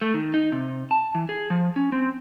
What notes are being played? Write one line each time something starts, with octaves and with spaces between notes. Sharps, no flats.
A3
D#3
D#4
C3
A5
E3
G#4
F3
C#4
C4